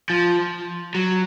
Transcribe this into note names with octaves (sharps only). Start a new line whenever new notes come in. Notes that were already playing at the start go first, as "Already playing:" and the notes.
F3
F#3